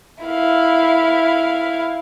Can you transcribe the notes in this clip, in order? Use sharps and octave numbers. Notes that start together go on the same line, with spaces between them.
E4 F5